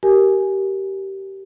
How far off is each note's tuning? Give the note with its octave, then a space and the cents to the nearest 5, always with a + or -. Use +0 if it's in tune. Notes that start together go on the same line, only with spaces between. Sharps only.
G4 -20 A#4 +0 G#5 +5